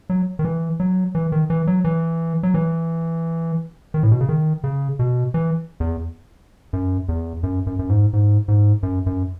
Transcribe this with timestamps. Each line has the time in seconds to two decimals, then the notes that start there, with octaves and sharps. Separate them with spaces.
0.10 F#3
0.39 D#3
0.45 E3
0.80 F#3
1.15 E3
1.32 D#3
1.50 E3
1.67 F#3
1.84 E3
2.43 F#3
2.54 E3
3.94 D#3
4.03 A2
4.11 B2
4.21 C#3
4.29 D#3
4.64 C#3
4.99 B2
5.34 E3
5.80 E2
6.73 F#2
7.09 E2
7.43 F#2
7.67 F#2
7.79 F#2
7.90 G#2
8.13 G#2
8.48 G#2
8.83 F#2
9.06 F#2